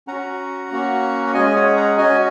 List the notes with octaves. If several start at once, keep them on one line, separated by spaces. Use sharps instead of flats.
C#4 F#4 F#5 A#5
A#3 C#4 F#4
F#5
G#3 C#4 G#4 D#5 G#5
G#5
C#5 F#5
F#5 A#5
C#4 F#4 D#5 G#5